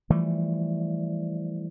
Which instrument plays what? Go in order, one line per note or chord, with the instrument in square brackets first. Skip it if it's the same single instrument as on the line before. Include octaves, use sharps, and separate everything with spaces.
[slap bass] E3 F3 G3 A3